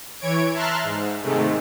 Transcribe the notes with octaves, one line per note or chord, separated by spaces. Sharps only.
E3 C#5 G#6 D7
E5 A5 A#5 C6 F6 F#6
G#2
G#2 C3 D#3 G#3 A3